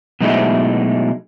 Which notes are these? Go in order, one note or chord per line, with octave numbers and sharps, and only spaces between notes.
B2 F#3 G#3 A3 D#4 E4